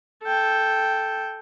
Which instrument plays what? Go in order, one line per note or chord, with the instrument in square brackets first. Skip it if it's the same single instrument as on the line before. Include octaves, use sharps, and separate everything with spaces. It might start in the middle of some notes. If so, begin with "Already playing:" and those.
[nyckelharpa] A4 G5